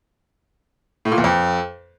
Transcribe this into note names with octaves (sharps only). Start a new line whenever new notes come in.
A2
A#2
E2
F2